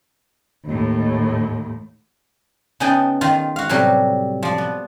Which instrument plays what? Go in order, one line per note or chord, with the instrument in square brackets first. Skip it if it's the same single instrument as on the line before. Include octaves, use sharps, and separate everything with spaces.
[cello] D#2 A2
[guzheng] C#3 B3 D#4 G#4 G5 A5
D#3 F4
F#4 F5
A2 C3 F#3 G3
F3 D5
B3